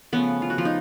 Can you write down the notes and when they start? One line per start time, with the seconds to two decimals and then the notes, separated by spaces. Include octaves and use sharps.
0.13 C#3 F3 A3 B3 B4
0.42 F4
0.50 F#4
0.58 F3 F4
0.65 D#4